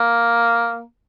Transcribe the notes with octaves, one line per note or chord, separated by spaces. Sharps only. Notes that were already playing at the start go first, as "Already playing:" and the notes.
Already playing: A#3